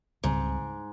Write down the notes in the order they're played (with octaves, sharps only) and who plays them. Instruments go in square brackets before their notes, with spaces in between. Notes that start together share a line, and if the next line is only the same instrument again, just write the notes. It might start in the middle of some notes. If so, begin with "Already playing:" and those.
[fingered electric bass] C#2 C#3 G3 C4 [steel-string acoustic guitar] G#2